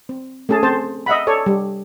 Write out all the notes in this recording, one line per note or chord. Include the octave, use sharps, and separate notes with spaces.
C4
A3 C#4 G#4 A5
C4 C5 A5
D#5 E5 F#5 B5
A4 C#5 D5
G3